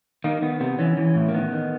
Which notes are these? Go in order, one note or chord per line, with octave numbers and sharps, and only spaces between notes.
D#3 A#3
D#3 B3
C3 B3
E3 C#4
E3
A2
A#3
D#3 B3
D#3